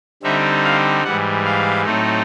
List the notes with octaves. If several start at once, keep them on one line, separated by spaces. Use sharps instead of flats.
D3 G3 C4 D#4 E5
F5
G#2 E3 G3 F#5
F5
A2 F#3 A3 C4 D#4